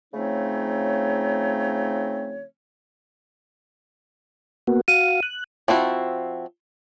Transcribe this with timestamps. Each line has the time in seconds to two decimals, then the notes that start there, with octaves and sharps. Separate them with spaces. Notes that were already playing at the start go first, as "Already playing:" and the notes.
0.14 C#3 F3 A3 C4 D#4 C#5
4.67 A#3 B3 F#4
4.88 F#4 F5 D#7
5.23 F#6
5.68 F3 C4 E4 F#4